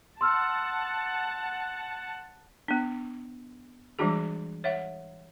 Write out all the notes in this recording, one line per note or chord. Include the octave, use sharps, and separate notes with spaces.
F#5 A5 C6 E6 F6
B3 D4
E3 G3 G#3 D4 F#4 G#4
C#5 E5 F#5